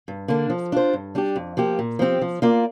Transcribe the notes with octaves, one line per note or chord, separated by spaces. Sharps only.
G2
D3 A#3 D4
F3
D4 F4 C5
G2
G3 D4 G4
F2
F3 A#3 G4
A#2
F3 C4 G4
F3
A#3 F4 D5